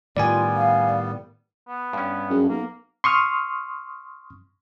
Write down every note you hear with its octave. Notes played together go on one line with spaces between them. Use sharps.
A2 D#3 G3 B3 F4 D5 G#5
F5
B3
G2 C#4
F#2 G#4
B1 A#3 B3
C6 C#6 D#6 F6